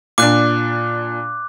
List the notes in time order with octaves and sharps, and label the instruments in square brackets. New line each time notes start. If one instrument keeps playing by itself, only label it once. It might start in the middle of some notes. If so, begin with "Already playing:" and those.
[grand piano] A#2 D4 [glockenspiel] D6 F#6